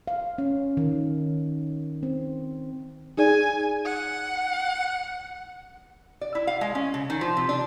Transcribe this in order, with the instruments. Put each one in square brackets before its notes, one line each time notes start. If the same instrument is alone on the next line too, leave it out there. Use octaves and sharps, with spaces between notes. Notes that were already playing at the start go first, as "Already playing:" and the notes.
[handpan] F5
C#4
D#3
C4
[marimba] D#4 G#4 D5 [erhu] G#5
[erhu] F#5
[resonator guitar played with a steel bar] D5
E4
F5
G#3
C#4
C#3
D#3
F3
C3
D4